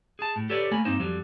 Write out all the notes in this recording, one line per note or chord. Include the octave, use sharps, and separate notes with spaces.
G#4 A5
A2
G4 A4 B4 C#5 D5
A3 A#3 G#5 B5
G2 A#3 C4 D#4 C5
F2 F#3 G3